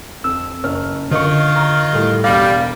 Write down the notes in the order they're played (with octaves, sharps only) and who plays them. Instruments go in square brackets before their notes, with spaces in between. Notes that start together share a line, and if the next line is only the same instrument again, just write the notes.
[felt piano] F2 [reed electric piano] E6
[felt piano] F#1 C#5 F6
[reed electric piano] D3 C#6 [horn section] D#3 F4 [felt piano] A#4 C#5 D#5
[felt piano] A#5 F6
A2 G3
[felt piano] E1 B5 A#6 [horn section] G3 [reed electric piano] F5